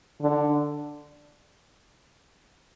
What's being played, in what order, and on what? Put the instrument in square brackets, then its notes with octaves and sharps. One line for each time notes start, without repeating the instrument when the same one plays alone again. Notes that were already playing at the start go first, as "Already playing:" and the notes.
[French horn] D3